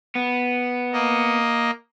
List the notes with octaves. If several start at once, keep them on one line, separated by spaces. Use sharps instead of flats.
B3
A#3 D#5